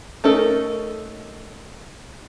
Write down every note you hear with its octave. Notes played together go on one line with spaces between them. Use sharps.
A3 C#4 D#4 A4 A#4